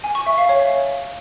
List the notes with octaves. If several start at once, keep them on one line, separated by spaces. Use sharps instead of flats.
G#5
C#6
E5
F5
C#5